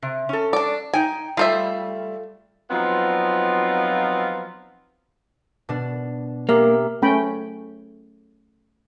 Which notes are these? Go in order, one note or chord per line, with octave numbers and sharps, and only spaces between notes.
C3
C#4 A4
D4 D5
D#4 G5 G#5
G3 A3 F4 C5 E5
F3 F#3 B3 C4 D#4 F4
B2 D4
A#3 G4 A#4 E5
A3 C#4 G5 B5